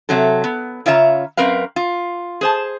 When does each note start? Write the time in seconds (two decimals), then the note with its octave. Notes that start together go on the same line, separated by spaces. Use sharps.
0.09 C3 F#3 A4
0.44 B3
0.86 C#3 F4 C#5 E5 A5 A#5
1.37 F#2 C4 A#4 B4 F5
1.76 F4
2.41 G#4 C5 A5